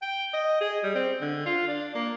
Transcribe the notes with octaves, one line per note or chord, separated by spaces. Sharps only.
G5
D#5
G#4
G3
C4
D3
F4
D4
A#3